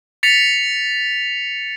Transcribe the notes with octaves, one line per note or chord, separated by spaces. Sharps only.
A6 B6 C#7 F7